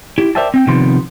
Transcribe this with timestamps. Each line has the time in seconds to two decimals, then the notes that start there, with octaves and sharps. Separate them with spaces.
0.18 E4 G4
0.35 A#4 C5 D5 E5 G5 A5
0.54 C4 G5
0.67 C3 D#3 F3 B3 C6